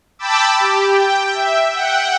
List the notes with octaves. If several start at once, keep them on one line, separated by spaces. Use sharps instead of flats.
G5 A5 B5 D6 E6
G4
G5
E5
F#5 G5